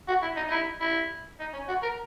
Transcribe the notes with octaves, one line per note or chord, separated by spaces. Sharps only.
F#4
E4
D#4
D#4
E4
E4
D#4
C#4
F#4
A#4